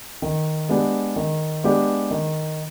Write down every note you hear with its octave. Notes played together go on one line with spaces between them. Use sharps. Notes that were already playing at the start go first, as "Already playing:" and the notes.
D#3
G#3 B3 D4 G4
D#3
G#3 B3 D4 G4
D#3